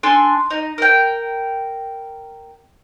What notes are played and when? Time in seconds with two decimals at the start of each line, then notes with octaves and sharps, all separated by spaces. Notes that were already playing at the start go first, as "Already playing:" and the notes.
0.03 D4 A4 G#5 C6
0.50 D#4
0.78 A#4 G5